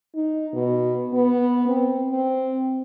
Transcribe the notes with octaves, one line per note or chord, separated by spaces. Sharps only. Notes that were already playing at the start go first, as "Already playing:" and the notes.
D#4
B2
B3
C4
C4